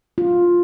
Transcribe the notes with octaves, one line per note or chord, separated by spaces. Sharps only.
F4